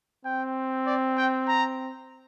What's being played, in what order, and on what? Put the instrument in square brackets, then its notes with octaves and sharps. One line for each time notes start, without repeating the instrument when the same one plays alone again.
[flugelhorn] C4 [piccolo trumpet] G5
[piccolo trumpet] D5
G5
A#5